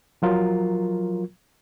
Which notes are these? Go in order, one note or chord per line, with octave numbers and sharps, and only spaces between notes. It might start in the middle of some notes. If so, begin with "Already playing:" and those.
F3 F#3 F4 A#4